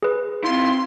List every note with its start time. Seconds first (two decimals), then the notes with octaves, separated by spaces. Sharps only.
0.03 G#4 B4
0.44 C4 E4 F4 C6